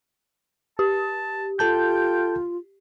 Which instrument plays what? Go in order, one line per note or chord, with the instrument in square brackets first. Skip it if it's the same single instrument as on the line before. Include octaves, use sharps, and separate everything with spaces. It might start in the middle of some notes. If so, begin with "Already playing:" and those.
[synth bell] G4 [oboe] A5
[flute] F4 [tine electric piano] A4 A5 G6 [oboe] G5